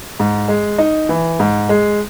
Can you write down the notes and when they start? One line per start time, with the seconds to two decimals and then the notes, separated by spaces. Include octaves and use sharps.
0.20 G#2
0.48 G#3
0.78 D#4
1.09 E3
1.40 G#2
1.69 G#3